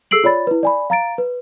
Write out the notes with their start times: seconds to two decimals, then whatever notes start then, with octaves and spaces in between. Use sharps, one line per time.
0.11 G#4 A4 E6 C7 D7 F#7
0.24 F4 C#5 D5 B5 A6
0.47 E4 B4
0.63 D5 G#5 B5
0.90 F5 A#5 A6 D7
1.18 B4